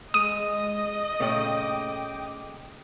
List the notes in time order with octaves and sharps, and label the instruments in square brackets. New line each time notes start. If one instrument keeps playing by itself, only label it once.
[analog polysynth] G#3 [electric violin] D#5 [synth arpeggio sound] D#6 D#7
[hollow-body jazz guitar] A#2 C#3 A3 [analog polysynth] G5 D6